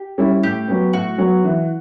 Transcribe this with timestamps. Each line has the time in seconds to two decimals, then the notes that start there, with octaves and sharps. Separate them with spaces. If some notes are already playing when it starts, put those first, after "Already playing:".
Already playing: G4
0.18 G3 C#4 E4
0.43 A2 G4
0.68 F#3 B3
0.93 A2 F#4
1.18 F#3 B3
1.44 E3